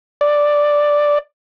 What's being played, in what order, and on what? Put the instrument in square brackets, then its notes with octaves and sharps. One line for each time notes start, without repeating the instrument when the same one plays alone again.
[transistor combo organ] D5